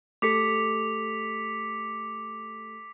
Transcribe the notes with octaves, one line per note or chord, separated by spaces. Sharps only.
A3 G4 A4 D6 B6 C#7